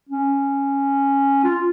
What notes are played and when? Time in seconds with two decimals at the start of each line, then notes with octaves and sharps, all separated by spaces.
0.09 C#4
1.44 F4